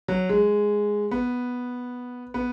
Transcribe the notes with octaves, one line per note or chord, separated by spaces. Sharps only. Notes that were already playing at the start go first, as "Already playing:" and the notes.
F#3
G#3
B3
B3